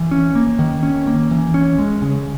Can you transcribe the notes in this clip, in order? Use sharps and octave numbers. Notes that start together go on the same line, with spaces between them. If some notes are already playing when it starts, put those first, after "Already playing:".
Already playing: E3
C#4
A#3
D#3
C#4
A#3
E3
C#4
G#3
C#3